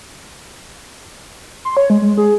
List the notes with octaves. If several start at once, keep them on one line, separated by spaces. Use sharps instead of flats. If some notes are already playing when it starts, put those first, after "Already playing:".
C6
C#5
G#3
G#3
G#4